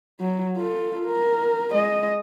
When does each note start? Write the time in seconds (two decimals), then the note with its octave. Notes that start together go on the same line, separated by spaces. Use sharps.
0.20 F#3
0.57 F4 A4
1.06 A#4
1.72 G#3 D#5